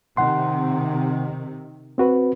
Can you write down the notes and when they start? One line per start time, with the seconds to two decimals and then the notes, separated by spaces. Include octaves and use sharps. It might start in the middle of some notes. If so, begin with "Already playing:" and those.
0.17 C3 D#3 F#5 C6
1.98 C4 F#4 B4